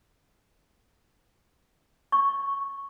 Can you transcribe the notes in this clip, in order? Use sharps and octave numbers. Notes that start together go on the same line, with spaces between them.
C#6